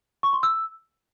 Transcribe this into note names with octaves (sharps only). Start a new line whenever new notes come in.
C#6
C6
E6